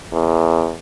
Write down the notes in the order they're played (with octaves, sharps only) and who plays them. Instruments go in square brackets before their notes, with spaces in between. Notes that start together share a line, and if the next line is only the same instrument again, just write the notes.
[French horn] E2